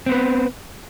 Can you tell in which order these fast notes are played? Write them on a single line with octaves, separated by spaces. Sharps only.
C4 B3 B4